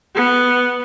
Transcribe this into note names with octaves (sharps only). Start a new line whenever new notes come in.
B3